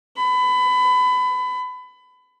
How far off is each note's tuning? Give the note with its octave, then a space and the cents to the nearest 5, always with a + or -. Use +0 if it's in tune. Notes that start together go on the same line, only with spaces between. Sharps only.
B5 +25